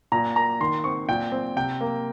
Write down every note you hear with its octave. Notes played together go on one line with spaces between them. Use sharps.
A#2 A#5
A#3 A#5
D#3 C6
C4 C#6
A#2 G5
C4
C3 G5
A#3